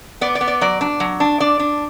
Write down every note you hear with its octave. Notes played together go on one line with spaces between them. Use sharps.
B3 D5
D5
B3
D5
F#3 D5
D4
F#3
D4
D4 D5
D4